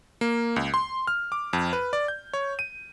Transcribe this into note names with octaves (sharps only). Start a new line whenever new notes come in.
A#3
C#2
C6
F6
D6
F2
B4
D5
G6
C#5
D#7